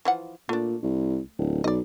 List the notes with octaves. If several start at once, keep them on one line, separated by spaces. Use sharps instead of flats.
E3 F3 F#5
A#2 A3 D4
C2
D1
B1 D5 D#5